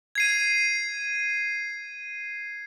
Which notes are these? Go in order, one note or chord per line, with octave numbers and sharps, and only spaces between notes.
G#6 C7 D#7